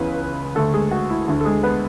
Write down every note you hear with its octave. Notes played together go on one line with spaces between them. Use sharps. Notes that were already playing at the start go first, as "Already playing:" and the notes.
Already playing: C#2 C#3 E3 B3 B4
D2 D3 A3 A4
G#3 G#4
F#4
E4
D2 D3
A4
G#3 G#4
B3 B4